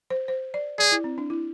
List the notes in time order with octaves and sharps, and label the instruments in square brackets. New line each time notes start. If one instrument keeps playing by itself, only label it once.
[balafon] C5
C5
D5
[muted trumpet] G#4 [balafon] D5
[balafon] E4
C4
D4
E4